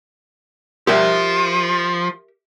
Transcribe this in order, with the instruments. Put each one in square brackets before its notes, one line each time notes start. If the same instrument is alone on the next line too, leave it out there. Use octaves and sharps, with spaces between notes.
[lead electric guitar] F3 [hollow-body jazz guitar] G4 A#4 E5